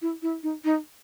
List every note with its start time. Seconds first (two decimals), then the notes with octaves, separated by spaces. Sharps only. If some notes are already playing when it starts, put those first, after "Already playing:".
0.02 E4
0.22 E4
0.43 D#4
0.64 D#4